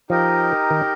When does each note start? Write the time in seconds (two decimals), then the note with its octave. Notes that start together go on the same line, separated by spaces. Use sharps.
0.10 F3 D#4 G4 A#4 D#5
0.71 D#3